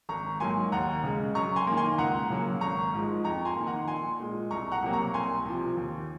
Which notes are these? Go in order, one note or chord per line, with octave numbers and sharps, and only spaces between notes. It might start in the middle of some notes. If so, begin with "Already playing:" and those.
G#1 A#5 C#6
G#2 F#3 A#3 G#5 C6
D#2 F#5 A#5
C#3 G#3
F#2 A#5 C#6
G#5 C6
D#3 A#3
G#5 C6
C#2 F#5 A#5
C#3 F#3 A#3
G#1 A#5 C#6
G#2 F3 G#3
F2 A#5 C#6
G#5 C6
D#3 A#3
F#5 A#5
A#1 G#5 C6
A#2 G#3
C2 A#5 C#6
F#5 A#5
C3 F#3 A#3
A#5 C#6
C2 G#5 C6
C3 F3
D#2